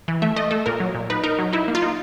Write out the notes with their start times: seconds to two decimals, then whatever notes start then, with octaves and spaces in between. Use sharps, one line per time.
0.08 E3
0.22 A3 E5
0.36 A3 D#5
0.51 A3 A4
0.66 A#2 A#4
0.80 F#3
0.95 A#2
1.10 D#4 B4
1.24 D#4 A#4
1.39 F#3
1.53 D#4 E4
1.68 A#3
1.75 F4
1.82 D#4